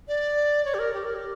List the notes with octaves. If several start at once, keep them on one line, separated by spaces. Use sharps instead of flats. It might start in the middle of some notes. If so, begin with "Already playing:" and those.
D5
C#5
G4
A#4
G4
A#4
G4